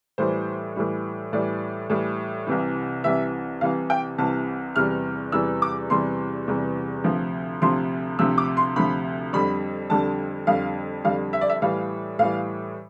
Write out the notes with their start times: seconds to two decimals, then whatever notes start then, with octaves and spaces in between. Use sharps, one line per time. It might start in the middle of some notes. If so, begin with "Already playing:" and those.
0.18 A2 E3 G3 C5
0.76 A2 E3 G3
1.33 A2 E3 G3 D5
1.90 A2 E3 G3
2.47 C2 C3 E3
3.04 C2 C3 E3 E5
3.61 C2 C3 E3 F5
3.90 G5
4.18 C2 C3 E3 A5
4.76 E2 C3 E3 G3 F6
5.32 E2 C3 E3 G3 E6
5.62 D6
5.90 E2 C3 E3 G3 C6
6.48 E2 C3 E3 G3
7.04 D2 C3 F3
7.62 D2 C3 F3 C6
8.19 D2 C3 F3 E6
8.38 D6
8.57 C6
8.76 D2 C3 F3 B5
9.33 F2 D3 G3 B5
9.90 F2 D3 G3 A5
10.47 F2 D3 G3 F5
11.05 F2 D3 G3 F5
11.33 E5
11.41 D5
11.49 E5
11.62 A2 E3 G3 F5
12.19 A2 E3 G3 F5